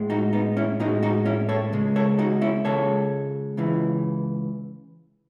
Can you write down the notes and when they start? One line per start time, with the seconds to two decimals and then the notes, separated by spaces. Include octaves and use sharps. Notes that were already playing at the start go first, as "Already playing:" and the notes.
Already playing: A2 G#3
0.10 D#4 F#4
0.33 B3 D#4
0.57 C#4 E4
0.80 A2 G#3 D#4 F#4
1.03 D#4 F#4
1.26 C#4 E4
1.49 A4 C#5
1.72 C#2 C#3 G#3
1.96 A4 C#5
2.19 D#4 F#4
2.41 C#4 E4
2.65 C#2 C#3 G#3 A4 C#5
3.57 C#2 C#3 E3